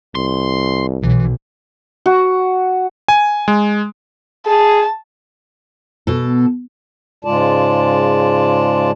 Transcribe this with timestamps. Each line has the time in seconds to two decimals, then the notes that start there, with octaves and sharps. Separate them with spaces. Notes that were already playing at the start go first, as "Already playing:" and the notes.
0.15 C2 C6
1.03 B1 E3
2.06 F#4
3.08 G#5
3.48 G#3
4.46 G#4 A5
6.07 B2 A4
7.25 G#2 C#3 G#3 F4 D5 A5